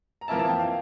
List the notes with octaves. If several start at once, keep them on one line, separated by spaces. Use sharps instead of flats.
A#5
F2 E3 A#3 E4 A5
A5
G5
F5